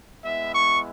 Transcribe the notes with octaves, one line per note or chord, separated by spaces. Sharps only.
G#3 B3 E4 E5
C#6